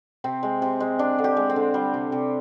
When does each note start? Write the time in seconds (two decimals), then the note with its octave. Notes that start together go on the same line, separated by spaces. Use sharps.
0.24 C3 C4
0.43 G#3
0.62 C3
0.80 G#3
0.99 G#3 D4
1.18 D3
1.24 G4
1.37 G#3
1.50 C4
1.56 D3
1.74 G3
1.94 C3
2.12 C3